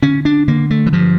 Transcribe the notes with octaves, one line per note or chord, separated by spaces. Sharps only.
D3 C#4
D4
D3 A#3
A3
E3
G2 F3